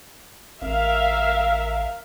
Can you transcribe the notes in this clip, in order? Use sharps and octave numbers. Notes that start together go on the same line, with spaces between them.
A1 A#4 E5 F5